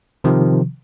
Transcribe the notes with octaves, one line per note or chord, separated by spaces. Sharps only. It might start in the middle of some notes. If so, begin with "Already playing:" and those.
C3 D#3 F3